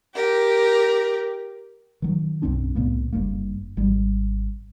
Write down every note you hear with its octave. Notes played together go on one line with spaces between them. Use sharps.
G4 A#4
D#3 F#3
B1 F#2 C4 D4
C2 A2 A#3 B3
F#1 G2 A#3
G#1 G3